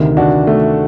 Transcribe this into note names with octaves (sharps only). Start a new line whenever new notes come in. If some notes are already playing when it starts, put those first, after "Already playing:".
Already playing: D2 C3 D#3
D4 F#4
A3